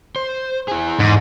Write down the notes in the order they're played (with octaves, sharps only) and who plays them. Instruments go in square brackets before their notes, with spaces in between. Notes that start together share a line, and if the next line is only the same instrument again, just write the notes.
[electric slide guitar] C5
E4 G#4
[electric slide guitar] E2 [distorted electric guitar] G#2